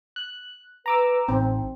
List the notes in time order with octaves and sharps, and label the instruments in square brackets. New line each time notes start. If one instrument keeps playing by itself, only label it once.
[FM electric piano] F#6
[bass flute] B4 [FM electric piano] A#5 D6 E6
[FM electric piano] A1 [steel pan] C4 [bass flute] D#4